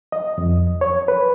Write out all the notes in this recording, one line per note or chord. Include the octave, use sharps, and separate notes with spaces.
D#5
F2
C#5
B4